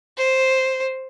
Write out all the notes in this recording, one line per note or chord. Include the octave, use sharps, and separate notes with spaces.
C5